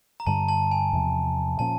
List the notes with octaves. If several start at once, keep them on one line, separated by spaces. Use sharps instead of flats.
A#5
G2 D3 G3 A5
A5
G#5
E2 C3 F3
A#2 F3 A#3 C#4 A5